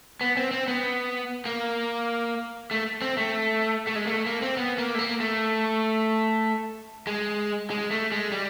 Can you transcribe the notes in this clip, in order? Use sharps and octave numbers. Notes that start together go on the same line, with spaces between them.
B3
C4
C4
B3
A#3
A3
C4
A3
A3
G#3
A#3
A3
A#3
C4
B3
A#3
A3
A#3
A3
G#3
G#3
A3
G#3
G3